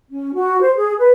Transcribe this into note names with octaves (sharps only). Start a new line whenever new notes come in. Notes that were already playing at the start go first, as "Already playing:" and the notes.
C#4
F#4
C5
G#4
B4